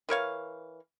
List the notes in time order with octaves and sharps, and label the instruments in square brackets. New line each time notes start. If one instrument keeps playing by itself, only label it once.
[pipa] E3 A#4 C#5 F5